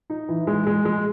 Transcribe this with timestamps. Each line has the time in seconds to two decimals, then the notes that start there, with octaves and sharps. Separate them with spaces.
0.10 D#4
0.29 E3
0.47 G#3
0.67 G#3
0.85 G#3